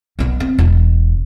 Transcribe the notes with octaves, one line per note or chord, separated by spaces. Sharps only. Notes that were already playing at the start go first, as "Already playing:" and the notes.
B1 B3
C4
E1